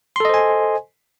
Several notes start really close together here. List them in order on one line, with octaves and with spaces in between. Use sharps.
C6 A4 D#5 C5 G#5